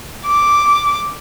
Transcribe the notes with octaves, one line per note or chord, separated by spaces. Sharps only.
D6